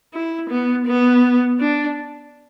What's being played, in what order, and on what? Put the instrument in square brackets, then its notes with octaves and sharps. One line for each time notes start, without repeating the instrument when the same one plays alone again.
[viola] E4
B3
B3
D4